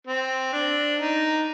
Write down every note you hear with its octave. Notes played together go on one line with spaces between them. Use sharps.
C4
D4
D#4